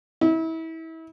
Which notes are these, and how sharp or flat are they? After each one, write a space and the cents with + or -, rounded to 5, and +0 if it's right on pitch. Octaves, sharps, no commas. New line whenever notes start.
E4 -30